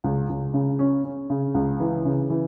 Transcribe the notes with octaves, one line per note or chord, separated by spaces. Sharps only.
C#2
C#2
C#3
C#4
C#4
C#3
C#2
E3
C#3
E3